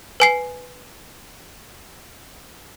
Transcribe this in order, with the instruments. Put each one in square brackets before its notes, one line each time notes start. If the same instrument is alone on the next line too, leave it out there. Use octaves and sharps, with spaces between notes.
[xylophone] B4 G#5 C7